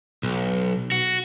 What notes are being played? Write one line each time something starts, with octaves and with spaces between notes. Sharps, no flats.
B1
F#4